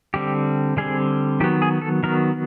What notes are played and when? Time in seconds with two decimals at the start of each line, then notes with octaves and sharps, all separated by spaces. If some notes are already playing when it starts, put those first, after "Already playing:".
0.14 D3 G3 C4 G4
0.77 D3 G3 C4 G#4
1.40 D#3 F#3 B3 G4
1.62 G#4
1.82 A4
2.03 D#3 F#3 B3 A#4